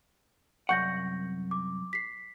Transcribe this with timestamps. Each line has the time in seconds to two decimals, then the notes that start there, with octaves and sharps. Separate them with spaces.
0.69 C2 F#2 F#5 C#6 G6 A#6
1.51 D6
1.93 B6 C7